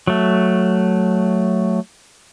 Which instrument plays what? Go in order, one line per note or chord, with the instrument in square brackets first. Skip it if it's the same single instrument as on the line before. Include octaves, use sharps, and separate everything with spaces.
[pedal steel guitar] F#3 A3